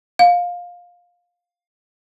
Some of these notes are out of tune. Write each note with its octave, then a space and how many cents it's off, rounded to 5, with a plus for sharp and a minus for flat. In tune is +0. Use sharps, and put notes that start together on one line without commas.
F5 +15